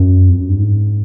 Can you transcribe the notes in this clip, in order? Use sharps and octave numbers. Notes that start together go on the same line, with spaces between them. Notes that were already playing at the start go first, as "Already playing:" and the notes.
Already playing: F#2
F2
F#2
G2
G#2